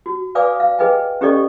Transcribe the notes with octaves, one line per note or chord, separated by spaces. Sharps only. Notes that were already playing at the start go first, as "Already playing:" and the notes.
F#4
B4 D5 F5 G#5 D6 D#6
F5
G#4 B4 D#5 G5 G#5
C#4 G4 A4 D5 D#5 C#6